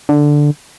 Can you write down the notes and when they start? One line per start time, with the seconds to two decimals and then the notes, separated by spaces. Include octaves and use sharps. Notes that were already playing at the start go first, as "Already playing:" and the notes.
0.09 D3